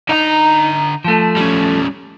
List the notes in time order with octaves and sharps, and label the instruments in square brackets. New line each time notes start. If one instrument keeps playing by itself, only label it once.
[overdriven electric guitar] D3 A#5 [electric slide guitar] D#4
[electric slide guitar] F3 A3
[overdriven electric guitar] G3 C#4